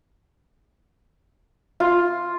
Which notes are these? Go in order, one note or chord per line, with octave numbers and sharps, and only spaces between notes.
F4